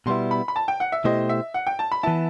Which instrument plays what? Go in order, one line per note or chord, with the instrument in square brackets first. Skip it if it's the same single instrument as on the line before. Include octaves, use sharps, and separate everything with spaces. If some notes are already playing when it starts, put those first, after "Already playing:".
[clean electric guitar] B2 G3 B3 E4 [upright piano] C6
[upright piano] B5
B5
A5
G5
F#5
E5
[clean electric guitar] B2 A3 E4 G4 C5 [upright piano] D#5
[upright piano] E5
F#5
G5
A5
B5
[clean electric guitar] E3 B3 E4 [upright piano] A5